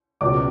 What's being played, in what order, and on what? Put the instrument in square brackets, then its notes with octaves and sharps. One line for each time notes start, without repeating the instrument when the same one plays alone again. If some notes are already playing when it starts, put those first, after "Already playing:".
[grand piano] C#2 B2 F#3 D5 D6